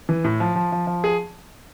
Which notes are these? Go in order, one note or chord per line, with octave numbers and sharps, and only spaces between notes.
E3
A2
F3
F3
F3
F3
G#4